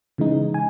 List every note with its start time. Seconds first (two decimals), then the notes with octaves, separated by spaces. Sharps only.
0.18 C#3 E3 G#3 D#4
0.54 G#5